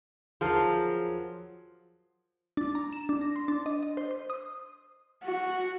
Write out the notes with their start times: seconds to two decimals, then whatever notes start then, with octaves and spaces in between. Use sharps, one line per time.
0.41 F3 F#3 G#4 A#4 A5
2.57 D4
2.75 A#5
2.93 E7
3.09 D4
3.21 A#6
3.36 C6
3.48 D4
3.66 D#5
3.83 D#5
3.97 C5
4.11 C5
4.30 D#6
5.24 F#4